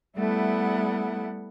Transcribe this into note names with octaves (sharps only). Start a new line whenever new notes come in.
G3 A3 B3 E4 F#5